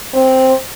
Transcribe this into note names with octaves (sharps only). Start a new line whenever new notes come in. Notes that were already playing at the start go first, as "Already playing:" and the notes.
C4